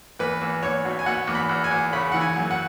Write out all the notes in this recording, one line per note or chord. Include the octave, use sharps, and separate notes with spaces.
E2 B4
E2
E2 C#5
B2
G#5
B2 F#5
E2
B5
E2
G#5
E2
C#3 B5
E3 F#5
G#5
F#2
F#5